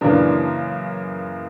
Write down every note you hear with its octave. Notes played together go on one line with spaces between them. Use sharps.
F#2 C#3 E3 A#3 D4